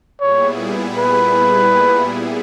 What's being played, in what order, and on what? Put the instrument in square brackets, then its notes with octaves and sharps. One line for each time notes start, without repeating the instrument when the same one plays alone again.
[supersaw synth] A#2 G3 B3 E4 G#4 [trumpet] C#5
[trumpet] B4